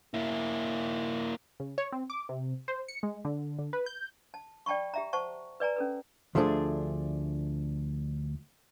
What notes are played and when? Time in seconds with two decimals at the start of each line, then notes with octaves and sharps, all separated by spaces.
0.14 A#3 E4
1.60 C#3
1.78 C#5
1.92 C4
2.10 D6
2.29 C3
2.68 C5
2.88 C#7
3.03 G#3
3.25 D3
3.59 D3
3.73 B4
3.86 G6
4.34 A5
4.66 D5 G5 A5 B5 C#6
4.94 G4 E5 A#5
5.13 C5 F#5 A5 C#6
5.60 B4 D5 G#5 A#5
5.76 C#4 A4 B4
6.35 D2 F3 A3 D4 G#4